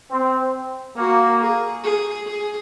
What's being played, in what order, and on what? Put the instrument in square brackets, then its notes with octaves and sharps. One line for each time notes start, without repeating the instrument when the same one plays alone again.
[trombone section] C4
[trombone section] A#3 [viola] F#4
[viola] G#4
G#4
G#4